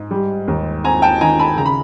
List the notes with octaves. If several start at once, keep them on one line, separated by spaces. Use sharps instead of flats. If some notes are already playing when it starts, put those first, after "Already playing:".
Already playing: G#2
G3
D#2
C4 G#5 A#5
G5 A5
D#3 G#5 A#5
A5 B5
C#3 A#5
B5